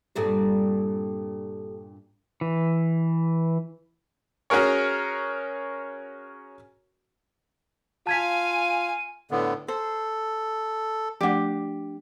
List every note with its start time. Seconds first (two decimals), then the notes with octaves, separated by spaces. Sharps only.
0.16 G2 A#2 C4 G4 A4
2.41 E3
4.50 C#4 F#4 G#4 A#4 C#5
8.07 F4 F5 G#5 A5 G#6 B6 D#7
9.31 A2 D3 B3
9.68 A4 C5
11.21 F3 A3 D4 G4 F#5